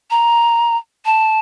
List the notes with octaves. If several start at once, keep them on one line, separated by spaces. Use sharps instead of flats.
A#5
A5